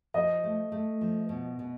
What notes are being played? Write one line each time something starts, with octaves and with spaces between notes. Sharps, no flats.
F3 D#5
A3
A3
F3
B2
B2